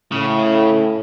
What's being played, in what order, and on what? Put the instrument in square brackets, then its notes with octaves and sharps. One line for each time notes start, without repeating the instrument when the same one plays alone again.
[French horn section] A2 [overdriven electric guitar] C#3